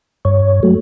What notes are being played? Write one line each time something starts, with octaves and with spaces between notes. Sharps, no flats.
G2 C#5
F#3 A3